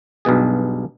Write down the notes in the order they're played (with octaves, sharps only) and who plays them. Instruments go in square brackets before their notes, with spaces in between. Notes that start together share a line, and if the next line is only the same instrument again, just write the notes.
[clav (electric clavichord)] B1 G2 B2 G#4